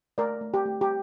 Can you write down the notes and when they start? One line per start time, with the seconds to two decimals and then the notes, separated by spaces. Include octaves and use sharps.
0.18 A3 A#4 D5
0.41 A3
0.54 G4
0.66 A3
0.81 G4